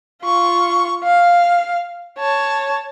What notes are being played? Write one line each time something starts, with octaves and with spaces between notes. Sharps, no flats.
F4 C#6
F5
C#5 A5